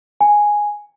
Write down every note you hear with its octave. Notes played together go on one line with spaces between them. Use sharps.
G#5